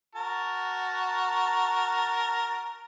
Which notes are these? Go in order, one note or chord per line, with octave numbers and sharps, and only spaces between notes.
F#4 A#4 A5